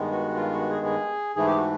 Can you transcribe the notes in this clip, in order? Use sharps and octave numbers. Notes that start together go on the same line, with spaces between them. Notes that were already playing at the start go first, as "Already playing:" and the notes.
Already playing: G2 D#3 G#3 B3
F#4
F4
F#4
G#4
G#4
G#2 E3 A3 G#4
G4
F#4